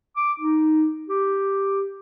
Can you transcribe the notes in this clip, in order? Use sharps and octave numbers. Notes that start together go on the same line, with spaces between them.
D6
D#4
G4